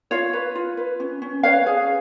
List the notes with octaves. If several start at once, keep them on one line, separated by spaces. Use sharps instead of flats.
F4 C#5 F5
B4
F4
B4
C#4
C#4
B4 C#5 F5
G#4